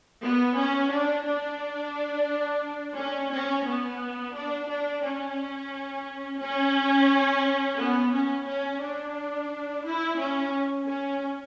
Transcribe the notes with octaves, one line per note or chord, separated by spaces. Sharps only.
B3
C#4
D4
D4
C#4
C#4
B3
D4
D4
C#4
C#4
B3
C#4
C#4
D4
E4
C#4
C#4